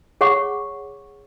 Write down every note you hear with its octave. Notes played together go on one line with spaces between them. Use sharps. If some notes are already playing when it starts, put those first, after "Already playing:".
G#4 C#5 F#5 C#6 D6